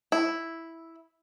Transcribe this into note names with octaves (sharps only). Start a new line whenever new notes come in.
E4